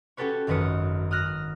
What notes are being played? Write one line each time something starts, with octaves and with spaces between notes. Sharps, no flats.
C#4 F#4 G4 A4 B4 C#5
G#1 F#2 D#3 B4 D#6 C#7
D#6 F6 F#6 A#6 D#7